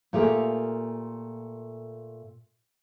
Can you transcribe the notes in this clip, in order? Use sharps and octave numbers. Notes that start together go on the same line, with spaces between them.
A#2 A3 F4 G4 G#4 A#4